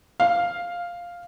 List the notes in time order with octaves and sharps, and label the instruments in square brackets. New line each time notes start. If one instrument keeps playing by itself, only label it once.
[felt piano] F5